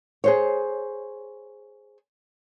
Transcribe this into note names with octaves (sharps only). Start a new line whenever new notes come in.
G#4 C5 C#5